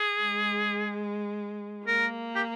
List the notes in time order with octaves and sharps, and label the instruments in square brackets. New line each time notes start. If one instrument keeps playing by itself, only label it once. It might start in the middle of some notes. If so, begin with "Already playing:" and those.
Already playing: [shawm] G#4
[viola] G#3
[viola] A#3 [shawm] A#4
[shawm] G4